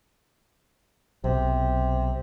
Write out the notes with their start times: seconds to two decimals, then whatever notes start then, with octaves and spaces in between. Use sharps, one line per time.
1.24 B1 C3